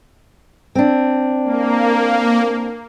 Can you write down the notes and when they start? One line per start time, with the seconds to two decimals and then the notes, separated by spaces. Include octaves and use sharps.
0.75 C4 D4
1.44 A#3